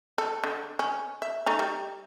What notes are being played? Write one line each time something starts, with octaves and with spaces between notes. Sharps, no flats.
A4
D3
C#4
E5
A3 D#4 A#5
G3